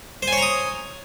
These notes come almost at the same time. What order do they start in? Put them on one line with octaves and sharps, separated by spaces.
C5 G#5 C#5 A#5 D#6